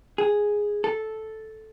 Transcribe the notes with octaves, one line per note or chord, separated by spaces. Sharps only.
G#4
A4